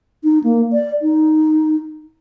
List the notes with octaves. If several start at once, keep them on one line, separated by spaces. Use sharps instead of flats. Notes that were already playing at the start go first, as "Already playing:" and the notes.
D#4
A#3
D5
D#4